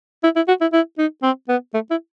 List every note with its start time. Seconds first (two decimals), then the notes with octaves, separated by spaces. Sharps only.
0.24 E4
0.36 E4
0.48 F#4
0.61 E4
0.73 E4
0.99 D#4
1.23 C4
1.49 B3
1.74 A3
1.91 E4